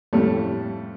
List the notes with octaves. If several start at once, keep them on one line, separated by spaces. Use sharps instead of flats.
F2 A2 G3 A3 C#4